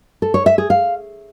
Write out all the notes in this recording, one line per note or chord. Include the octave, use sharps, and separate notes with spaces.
A4
C#5
E5
G#4
F5